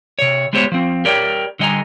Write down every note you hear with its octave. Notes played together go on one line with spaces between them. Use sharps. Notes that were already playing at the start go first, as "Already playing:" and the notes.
C3 C#5
G#3 B3 G4 C5 C#5
F3 C4
G4 A#4 C#5 D5 G5
D3 G3 D#5 F#5 G#5 A#5